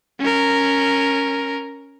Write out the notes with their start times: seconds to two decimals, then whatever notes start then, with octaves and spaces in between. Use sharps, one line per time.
0.19 C#4 A#4